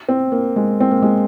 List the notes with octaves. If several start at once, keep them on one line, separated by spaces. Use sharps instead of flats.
C4
A#3
G#3
C4
A#3
G#3